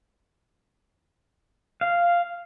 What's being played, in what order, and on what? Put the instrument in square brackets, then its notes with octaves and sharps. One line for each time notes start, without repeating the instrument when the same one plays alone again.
[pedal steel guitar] F5